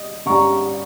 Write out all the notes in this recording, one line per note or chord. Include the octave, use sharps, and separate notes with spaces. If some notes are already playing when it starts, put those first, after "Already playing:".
Already playing: G3 D#5
G2 G3 C#4 A#5 C#6